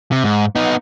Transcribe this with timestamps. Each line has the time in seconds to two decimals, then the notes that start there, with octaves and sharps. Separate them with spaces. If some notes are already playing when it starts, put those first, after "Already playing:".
0.12 C3
0.24 G#2
0.55 B3 D#4